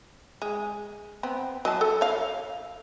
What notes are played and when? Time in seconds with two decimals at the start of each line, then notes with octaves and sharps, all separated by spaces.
0.42 G#3
1.23 B3 C4
1.65 F#3 D#5 A5
1.81 A4
2.01 C#5 F5